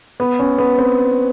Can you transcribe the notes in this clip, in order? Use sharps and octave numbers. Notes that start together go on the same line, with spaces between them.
B3
C#4
B3
C4